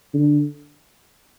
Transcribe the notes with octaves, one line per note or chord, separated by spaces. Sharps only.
D3